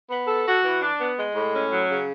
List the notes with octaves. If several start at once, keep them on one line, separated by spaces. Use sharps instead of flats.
B3
A4
F#4
E3
D4
B3
G#3
A2
C#4
F#3
C#3